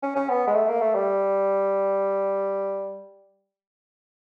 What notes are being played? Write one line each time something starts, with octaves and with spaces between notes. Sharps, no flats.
C#4
C#4
B3
G#3
A3
A#3
A3
G3